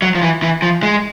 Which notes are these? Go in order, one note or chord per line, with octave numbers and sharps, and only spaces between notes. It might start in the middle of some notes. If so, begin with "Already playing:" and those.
F#3
F3
E3
E3
F3
G#3